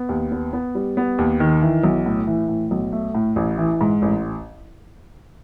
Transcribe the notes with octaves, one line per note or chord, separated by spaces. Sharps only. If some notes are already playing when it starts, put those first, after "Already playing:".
Already playing: B3
D#2
B3
B3
G3
B3
D#2
D#3
E3
B1
A2
E3
A2
B1
A3
A2
A1
E3
G#2
A1